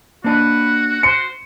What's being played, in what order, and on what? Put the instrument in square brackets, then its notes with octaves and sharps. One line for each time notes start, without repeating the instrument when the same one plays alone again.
[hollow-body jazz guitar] A#3 D4 D#5 [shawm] F#4 [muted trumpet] B4
[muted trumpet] C5 [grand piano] C#7